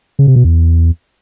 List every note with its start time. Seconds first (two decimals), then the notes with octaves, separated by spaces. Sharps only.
0.19 C#3
0.27 C3
0.36 B2
0.44 E2